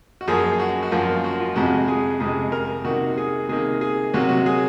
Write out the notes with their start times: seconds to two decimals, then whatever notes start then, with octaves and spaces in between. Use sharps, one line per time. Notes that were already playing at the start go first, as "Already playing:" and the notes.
0.21 F#4
0.28 F#2 F3 A#3 G#4
0.60 F#4
0.83 F#4
0.91 F#2 F3 A#3 F4
1.24 F#4
1.40 F4
1.56 F2 C3 F3 G#3 F#4
1.88 G#4
2.20 F2 C3 F3 G#3 G#4
2.52 A#4
2.85 C3 D#3 A#3 F#4
3.17 G#4
3.49 C3 D#3 A#3 G#4
3.81 G#4
4.14 C3 F#3 A#3 F#4
4.29 F#4
4.46 G#4